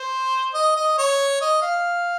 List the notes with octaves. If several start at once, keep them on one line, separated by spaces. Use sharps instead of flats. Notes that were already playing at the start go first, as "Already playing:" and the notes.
Already playing: C5
D#5
D#5
C#5
D#5
F5